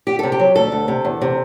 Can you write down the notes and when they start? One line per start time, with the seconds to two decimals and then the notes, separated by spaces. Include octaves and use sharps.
0.07 D2 G4
0.19 C3 A4
0.32 G4
0.40 F#3
0.56 D2 A4
0.72 D2
0.88 C3
1.05 E2
1.22 C3